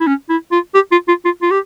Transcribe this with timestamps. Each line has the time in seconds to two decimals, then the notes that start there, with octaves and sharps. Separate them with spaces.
0.01 E4
0.07 C#4
0.29 E4
0.52 F4
0.75 G4
0.92 F4
1.08 F4
1.25 F4
1.42 F4
1.51 G4